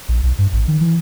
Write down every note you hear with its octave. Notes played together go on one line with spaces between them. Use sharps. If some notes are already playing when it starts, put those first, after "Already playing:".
A#1
B1
G2
A1
D#3
E3